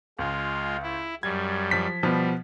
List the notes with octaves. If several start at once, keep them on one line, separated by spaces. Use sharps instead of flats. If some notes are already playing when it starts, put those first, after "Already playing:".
C#2 G#3 F4
E4
F#2 G3 G#6
F3 B6
B2 F3 G3 B3